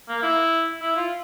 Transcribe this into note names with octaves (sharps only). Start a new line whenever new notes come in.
A#3
E4
E4
F4